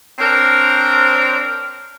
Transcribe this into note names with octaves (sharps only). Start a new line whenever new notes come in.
C4 D4 A#4 C5 C#5